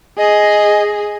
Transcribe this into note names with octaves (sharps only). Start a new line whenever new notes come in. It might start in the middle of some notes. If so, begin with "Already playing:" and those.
G#4 D#5